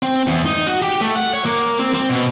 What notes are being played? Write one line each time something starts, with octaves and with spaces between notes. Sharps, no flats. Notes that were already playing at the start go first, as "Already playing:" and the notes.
C4
E2
D#4
F#4
G4
A3
F#5
C#5
A#3
C4
C4
B2